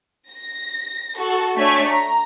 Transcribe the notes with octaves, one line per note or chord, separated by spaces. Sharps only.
A#6
F#4 A4
A3 D4 C#5 G#5 B6
A#5